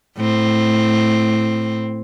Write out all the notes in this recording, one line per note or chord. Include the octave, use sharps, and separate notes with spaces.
A2 C4